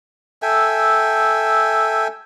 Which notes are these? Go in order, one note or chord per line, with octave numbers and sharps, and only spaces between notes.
A4 E5 G5 G#5